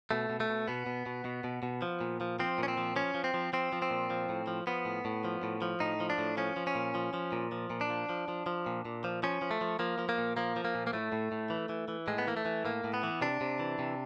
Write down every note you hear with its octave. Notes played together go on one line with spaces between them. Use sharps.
B2 A3
B2
A3
B2
B2 B3
B2
B2
B2
B2
B2
F3
A#2
F3
F3 C4
A#2 C#4
C4
F3
F3 C#4
F3
C4
F3
F3 C4
F3
C4
A#2
F3
A2
F3
F3 B3
A2
A2
F3
A2
F3
A2 D#4
F3
D4
A2
F3 C#4
F3
C#4
A#2
F3
F3
A#2
F3
A#2
D4
F3
F3
F3
F3
A#2
A#2
F3
F3 C#4
F3
A3
F3
F3 A#3
F3
A#3
A#2
F3 A#3
F3
A#3
A#2
A#3
A2 A3
A2
A2
E3
E3
E3
A2 G#3
B3
E3 A#3
A3
E3
A2 A#3
A2
B3
E3
C3 D4
C3
E3
C3